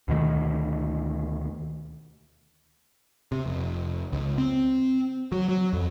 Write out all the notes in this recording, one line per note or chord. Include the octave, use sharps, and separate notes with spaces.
D2 B2 D#3 A3
C3
F1
C#2
C4
F#3
F#3
F2